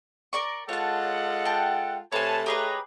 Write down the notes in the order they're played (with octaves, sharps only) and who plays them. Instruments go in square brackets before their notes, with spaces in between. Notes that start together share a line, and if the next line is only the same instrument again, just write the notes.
[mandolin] A#4 D5 C#6
[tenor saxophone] G#3 [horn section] F4 A4 F#5 [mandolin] C#5 A5
[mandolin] G5 A5
[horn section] C3 C#5 A5 [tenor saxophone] A3 [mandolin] B4 G#5
[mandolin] G4 G#4 B4 [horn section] C#5 D#5 A#5